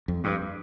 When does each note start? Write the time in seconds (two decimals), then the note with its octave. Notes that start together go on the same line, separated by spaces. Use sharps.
0.08 F2
0.24 G2